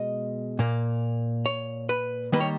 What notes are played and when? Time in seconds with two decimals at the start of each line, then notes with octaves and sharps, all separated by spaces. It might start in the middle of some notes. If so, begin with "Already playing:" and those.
Already playing: B2 G#3 D#5
0.59 A#2 A#3
1.46 C#5
1.89 B4
2.32 D#3 G3 A#3 B4
2.40 C#5